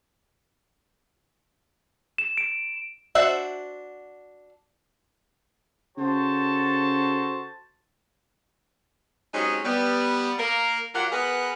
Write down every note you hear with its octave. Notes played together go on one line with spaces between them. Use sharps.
E7
D7
D4 F#4 C5 E5 F#5
C#3 F#4 A4 C5 A5
F#3 G#3 C4 C#4 D#4 G4
G3 B3
A#3 A#4
F#3 F4 G4 A#4 F#5
B3 G#4 A#4 B4